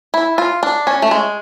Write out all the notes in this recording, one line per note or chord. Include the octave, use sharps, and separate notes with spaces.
E4
F4
D4
C#4
A3
G#3